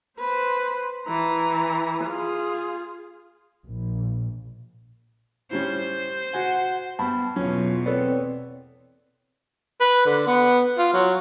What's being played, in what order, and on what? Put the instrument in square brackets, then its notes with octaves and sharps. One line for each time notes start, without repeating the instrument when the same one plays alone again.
[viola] B4 C5
E3 A#5
F4 G#4
[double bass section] A#1
[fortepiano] A2 G3 C#4 [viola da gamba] C5
[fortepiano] F#4 G#5 [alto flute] F#5
[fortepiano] G2 [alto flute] B3 [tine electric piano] A5 B5
[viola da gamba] E2 B2 [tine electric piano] F#3 [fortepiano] C#4 [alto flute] F4
[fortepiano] B3 A4 [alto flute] C4 [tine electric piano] C#5 D5
[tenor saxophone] B4
D3
B3
F4
F#3